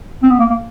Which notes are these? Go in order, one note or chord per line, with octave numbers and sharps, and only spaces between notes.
C4
B3
A#3
A#3